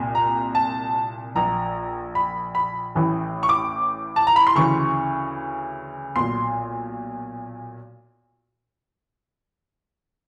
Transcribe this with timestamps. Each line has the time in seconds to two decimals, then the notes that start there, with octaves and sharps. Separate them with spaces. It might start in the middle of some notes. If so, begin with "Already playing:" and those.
Already playing: C2 A#2
0.15 A#5
0.55 A5
1.35 A#1 A#2 A#5
2.15 B5
2.55 B5
2.95 A1 A2 E3
3.43 C#6
3.49 D6
4.16 A5
4.27 A#5
4.36 B5
4.47 C6
4.55 D2 C#3 E3 C#6
6.16 B1 A#2 C6